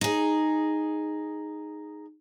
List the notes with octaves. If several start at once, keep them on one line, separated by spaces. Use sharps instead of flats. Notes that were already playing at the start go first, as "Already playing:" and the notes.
D#4 G#4